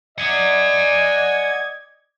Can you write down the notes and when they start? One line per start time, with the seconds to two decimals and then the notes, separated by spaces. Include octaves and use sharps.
0.18 D5 D#5 F#5 G#5 G#6